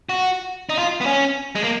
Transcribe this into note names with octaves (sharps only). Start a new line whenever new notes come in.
F#4
D#4
F4
B3
C#4
G#3
A#3